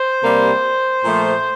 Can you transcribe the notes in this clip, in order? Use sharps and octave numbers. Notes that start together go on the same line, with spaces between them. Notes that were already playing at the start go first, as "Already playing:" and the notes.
Already playing: C5
C3 G3 A#3
A#2 F3 A3